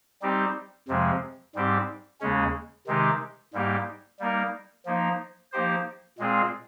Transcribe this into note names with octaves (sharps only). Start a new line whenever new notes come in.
G3 C4 D#4 G4
F2 C3 F3 G#3
G#2 G3 C4 G4
D#2 C#3 G#3 C#4
C3 D#3 G#3 D#4 G4
G#2 G3 A#3 D#4 G4
G3 A#3 D#4 A#4
F3 A#3 D#4
F3 A#3 D#4 G4 C5
A#2 G#3 C4 F4 G#4